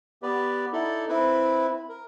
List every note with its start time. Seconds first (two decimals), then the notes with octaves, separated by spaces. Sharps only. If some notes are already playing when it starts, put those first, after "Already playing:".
0.23 B3 G4 B4 D5
0.73 D#4 E4 A4 D5
1.09 C4 E4 B4
1.89 A#4